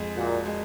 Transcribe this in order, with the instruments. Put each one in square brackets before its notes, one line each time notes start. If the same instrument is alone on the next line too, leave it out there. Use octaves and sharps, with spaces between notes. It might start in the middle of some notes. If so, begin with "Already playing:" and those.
Already playing: [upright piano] F2 G#3
[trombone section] A#2 [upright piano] F#4
[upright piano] G#3